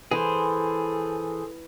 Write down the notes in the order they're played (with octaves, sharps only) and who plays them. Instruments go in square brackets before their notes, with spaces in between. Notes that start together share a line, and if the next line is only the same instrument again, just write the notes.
[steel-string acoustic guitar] E3 [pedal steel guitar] G#4 C5 [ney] A4